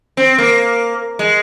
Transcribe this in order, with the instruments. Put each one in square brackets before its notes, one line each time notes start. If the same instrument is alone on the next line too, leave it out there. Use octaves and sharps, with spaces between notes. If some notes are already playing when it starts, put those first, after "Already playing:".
[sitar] C4
A#3
G#3